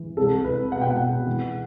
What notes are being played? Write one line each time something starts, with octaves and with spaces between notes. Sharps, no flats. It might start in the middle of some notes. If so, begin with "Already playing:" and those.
Already playing: E3
C2 A4
C2 B4
B2 F#5
G5
F#5
B2
E3